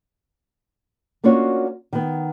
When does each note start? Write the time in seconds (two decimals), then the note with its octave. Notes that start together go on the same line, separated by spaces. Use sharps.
1.24 A#3 C#4 D4 F4 F#4 C#5
1.93 D#3 B3